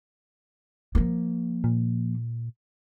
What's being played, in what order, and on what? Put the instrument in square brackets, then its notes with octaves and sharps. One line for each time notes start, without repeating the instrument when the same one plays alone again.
[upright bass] F3 A#3
[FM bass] A#2